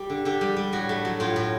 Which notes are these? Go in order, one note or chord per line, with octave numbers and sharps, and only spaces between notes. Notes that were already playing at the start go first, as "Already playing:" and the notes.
Already playing: G3 G4
D3
D3 G4
G3
G3
A2 F#4
A3
F#3
A2 F4
A2